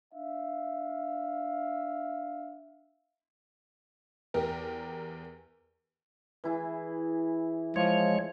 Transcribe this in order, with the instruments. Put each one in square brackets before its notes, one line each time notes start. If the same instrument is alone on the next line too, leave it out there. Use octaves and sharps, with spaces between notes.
[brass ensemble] D4 E5 F5
[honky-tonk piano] E2 G4 A#4
[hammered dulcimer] E3 E4 G#4
[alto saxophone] F3 [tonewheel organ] G#3 C#5